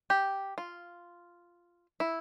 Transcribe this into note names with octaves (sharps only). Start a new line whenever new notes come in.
G4
F4
E4